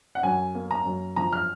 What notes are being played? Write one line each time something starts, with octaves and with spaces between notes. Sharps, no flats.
F#5
F#2 G#5
A#3
A#5
F#2
F3 A#5
F6